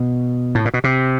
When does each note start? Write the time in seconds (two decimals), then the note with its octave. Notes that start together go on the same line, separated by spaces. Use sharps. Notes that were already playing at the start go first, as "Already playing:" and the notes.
Already playing: B2
0.55 A2
0.65 A#2
0.74 B2
0.84 C3